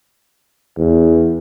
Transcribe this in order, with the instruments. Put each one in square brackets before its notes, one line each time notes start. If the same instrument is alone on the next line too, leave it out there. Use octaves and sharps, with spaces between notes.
[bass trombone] E2